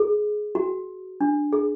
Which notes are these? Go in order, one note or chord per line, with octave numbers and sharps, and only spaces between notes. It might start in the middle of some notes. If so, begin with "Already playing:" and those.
Already playing: G#4
F#4
D4
G#4